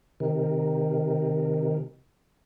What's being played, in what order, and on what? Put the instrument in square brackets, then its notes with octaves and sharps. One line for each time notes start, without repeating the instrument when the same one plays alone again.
[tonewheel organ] C3 D#3